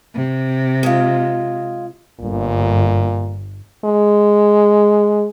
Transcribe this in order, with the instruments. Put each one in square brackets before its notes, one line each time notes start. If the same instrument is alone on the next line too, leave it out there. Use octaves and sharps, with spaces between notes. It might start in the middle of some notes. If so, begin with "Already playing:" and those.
[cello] C3
[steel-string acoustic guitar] G#3 F4
[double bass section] G1 [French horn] A#2
[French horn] G#3